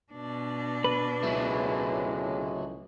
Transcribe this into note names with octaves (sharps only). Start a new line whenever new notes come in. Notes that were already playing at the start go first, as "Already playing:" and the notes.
B2 D4
B4
C#2 A2 F#3 G#3 E4